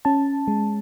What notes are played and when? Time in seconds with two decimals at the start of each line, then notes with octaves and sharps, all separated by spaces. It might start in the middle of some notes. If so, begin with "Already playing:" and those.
0.05 C#4 A5
0.48 G#3